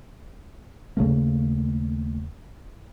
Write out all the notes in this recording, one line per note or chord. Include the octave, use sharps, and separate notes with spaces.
D#2 C#3 A3 A#3